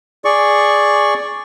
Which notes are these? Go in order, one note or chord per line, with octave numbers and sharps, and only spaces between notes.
G#4 D5 C#6